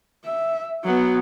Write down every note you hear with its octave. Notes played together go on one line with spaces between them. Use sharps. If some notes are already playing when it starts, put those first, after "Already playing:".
E5
F#3 B3